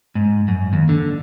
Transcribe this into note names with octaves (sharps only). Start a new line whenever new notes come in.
G#2
F#2
D#2
D3